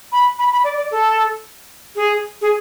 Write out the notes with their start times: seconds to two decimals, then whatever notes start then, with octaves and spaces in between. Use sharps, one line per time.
0.12 B5
0.39 B5
0.52 B5
0.64 D5
0.77 D5
0.91 A4
1.95 G#4
2.41 G#4